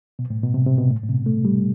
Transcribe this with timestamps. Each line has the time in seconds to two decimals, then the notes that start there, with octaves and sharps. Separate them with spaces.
0.19 B2
0.30 A2
0.43 B2
0.54 C3
0.66 C3
0.78 B2
0.90 A2
1.03 A2
1.09 C3
1.14 B2
1.26 A3
1.45 G3